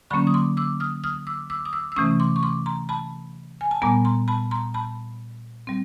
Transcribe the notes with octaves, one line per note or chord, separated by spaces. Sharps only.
D3 F#3 A#3 C#4 B5 C#6
D#6
C6 D6
D6 E6
D#6 F6
D#6 F6
D6 E6
D6 E6
D#6
D6 E6
E6
C3 E3 A3 C#4 C#6 D#6
C6 D6
C#6
C6 D6
A#5 C6
A5 B5
G#5
A5
A#2 G3 B3 G#5 A#5
A#5 C6
A5 B5
A#5 C6
A5 B5
G3 C4